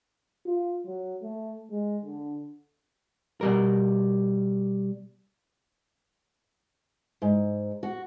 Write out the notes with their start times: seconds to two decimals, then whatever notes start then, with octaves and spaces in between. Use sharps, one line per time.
0.46 F4
0.87 F#3
1.22 A3
1.71 G#3
2.05 D3
3.41 B2 G3 A#4
7.22 G#2
7.83 F#4